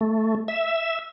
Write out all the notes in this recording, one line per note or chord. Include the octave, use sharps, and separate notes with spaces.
A3
E5